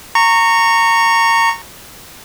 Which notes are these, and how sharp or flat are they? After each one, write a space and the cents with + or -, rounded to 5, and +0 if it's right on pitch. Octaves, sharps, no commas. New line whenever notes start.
A#5 -20 C#6 -5